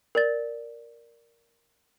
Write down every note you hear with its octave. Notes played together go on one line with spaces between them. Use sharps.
A#4 D5 A6